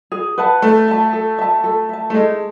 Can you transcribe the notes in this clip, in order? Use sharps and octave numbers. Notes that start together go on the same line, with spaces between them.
G#4
B4 F#5 A5
A3 A4
E5 A5
A4
E5 A5
A4
E5 A5
A3
G#3 A4